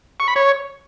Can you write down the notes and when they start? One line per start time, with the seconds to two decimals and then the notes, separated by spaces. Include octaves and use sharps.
0.20 C#6
0.28 B5
0.36 C#5